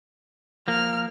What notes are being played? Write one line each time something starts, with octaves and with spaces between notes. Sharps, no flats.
F3 A#3 F6